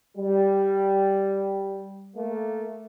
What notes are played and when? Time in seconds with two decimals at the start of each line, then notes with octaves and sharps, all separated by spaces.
0.18 G3
2.16 A3 A#3